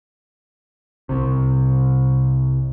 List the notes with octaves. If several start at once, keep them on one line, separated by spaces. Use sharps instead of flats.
C2 C3